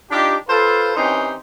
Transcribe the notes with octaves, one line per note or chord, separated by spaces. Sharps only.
D4 D#4 F4 G4
F4 A4 B4 C5 F5 C6
E3 C4 C#4 D#4 G4 C6